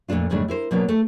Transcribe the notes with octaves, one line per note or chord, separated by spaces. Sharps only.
F2 A#2 A3 D4 F4
F2 G#2 C#3 G3 A3 D4
E4 A#4 C5
B2 F#3 A#3 B3 D4
A3